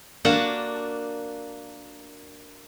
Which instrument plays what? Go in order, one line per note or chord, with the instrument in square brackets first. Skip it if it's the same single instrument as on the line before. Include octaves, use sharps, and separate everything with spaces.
[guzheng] A#3 D4 F#4 F#5 A5